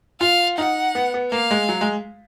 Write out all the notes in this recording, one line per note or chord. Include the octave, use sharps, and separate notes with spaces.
F4 F5
D#4 F#5
B3
B3
A#3 F5
G#3
F#3
G#3